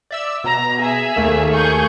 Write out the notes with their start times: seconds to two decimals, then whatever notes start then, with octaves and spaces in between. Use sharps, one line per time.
0.11 D5 E5 E6
0.44 B2 A#5
0.79 G#4 E5
1.16 D#2 A3 A#3
1.52 G#4 C#6 G6